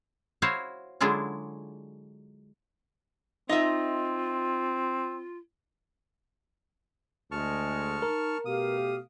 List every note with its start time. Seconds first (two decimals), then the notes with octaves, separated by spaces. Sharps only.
0.42 E4 F#4 C5 C#5 F5
1.01 D3 F#3 G#3 D4 E4 F4
3.49 C4 D#4 F4 D#5 E5
7.32 D2 G#3 A5 C#6 F6
8.02 D#4 A#4
8.46 B2 A3 G4 F5 D#6